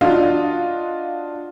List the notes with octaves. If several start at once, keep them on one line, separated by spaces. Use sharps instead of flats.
D4 F4 F#4 D#5 F5